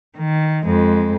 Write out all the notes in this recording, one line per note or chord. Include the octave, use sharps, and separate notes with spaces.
D#3
F2 G#3